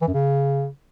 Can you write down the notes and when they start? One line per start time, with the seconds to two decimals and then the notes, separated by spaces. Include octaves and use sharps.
0.02 E3
0.08 F#2
0.14 C#3